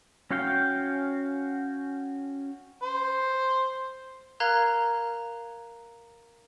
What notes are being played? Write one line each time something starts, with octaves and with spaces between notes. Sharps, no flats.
C#4 F#4 C#5 F5 G5
C5
A#4 F5 A#5 F#6 G#6